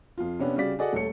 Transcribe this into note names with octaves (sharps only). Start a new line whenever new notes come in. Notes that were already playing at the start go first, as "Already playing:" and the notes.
F2 F4
C3 B3 C#4 D4
C#3 G3 F#4 D5 B6
F#4 G#4 A4 D5 D#5 F#5
D#1 A3 A4 C#5 C#7